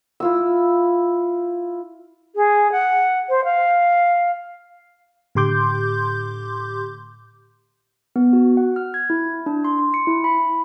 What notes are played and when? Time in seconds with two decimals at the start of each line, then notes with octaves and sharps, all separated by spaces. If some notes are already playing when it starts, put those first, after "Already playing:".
0.20 E4 F4 E6
2.36 G#4
2.72 F#5
3.29 C5
3.44 F5
5.35 A2 D3 G4 C6 D6 G6
8.16 B3
8.33 F#4
8.57 F#5
8.76 F6
8.94 G#6
9.10 E4
9.46 D4
9.64 C6
9.79 C6
9.94 C#7
10.07 E4
10.24 B5